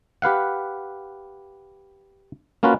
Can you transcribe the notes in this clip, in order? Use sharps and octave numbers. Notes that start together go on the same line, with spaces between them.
G4 B4 F5 F#5
A#3 C#4 F4 F#4 B4